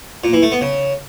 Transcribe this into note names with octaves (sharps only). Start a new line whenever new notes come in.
A#2
E3
A3
B3
C#3